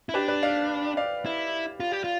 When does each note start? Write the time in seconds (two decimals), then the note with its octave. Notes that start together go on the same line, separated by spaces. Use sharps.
0.09 E4
0.14 D4 G4 B4
0.28 B4 D5
0.43 D5 F5
0.97 D5 F5
1.26 E4
1.80 F4
1.92 G4
2.04 F4